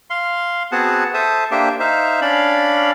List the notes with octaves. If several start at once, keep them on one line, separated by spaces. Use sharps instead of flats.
F5 C6
B3 C4 F#4 G#4 F#5 A5
A4 C5 E5 A5 D#6
A#3 D4 G4 C5 E5 G5
D#4 C5 E5 F5
C#4 D4 D5 F5 B5